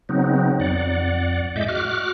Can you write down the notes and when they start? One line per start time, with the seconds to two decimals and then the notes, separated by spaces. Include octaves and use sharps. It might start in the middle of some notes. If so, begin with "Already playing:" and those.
0.09 C#3 F#3 B3 C4 D#4
0.60 F2 D5 F#5
1.56 A2 G#3 D#5 E5 D6 G6
1.68 F#4 D6 F6 F#6